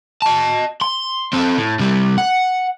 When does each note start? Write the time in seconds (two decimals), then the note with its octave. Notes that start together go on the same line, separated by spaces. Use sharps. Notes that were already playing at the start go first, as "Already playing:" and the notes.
0.22 D#5 A5
0.81 C6
1.33 C4 A4
1.58 A2
1.80 C3 G3
2.18 F#5